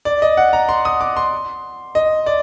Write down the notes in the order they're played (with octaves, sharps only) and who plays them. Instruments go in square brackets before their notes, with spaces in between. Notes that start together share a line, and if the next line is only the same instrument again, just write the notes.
[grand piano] D5
D#5
F#5
A#5
C6
D#6
D6
C6
D#5
D5